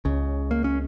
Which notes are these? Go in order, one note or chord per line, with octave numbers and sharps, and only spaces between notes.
C#2 C#3
A#3
C#4